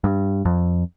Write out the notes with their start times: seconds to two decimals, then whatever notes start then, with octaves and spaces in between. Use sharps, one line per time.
0.04 G2
0.45 F2